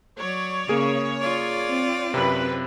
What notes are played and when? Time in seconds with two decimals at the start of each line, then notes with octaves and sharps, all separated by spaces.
0.19 F#3 C#5 D5
0.68 C#3 A#3 G#4 D7
1.21 F4 D5
1.67 C4
2.14 F#2 C3 B4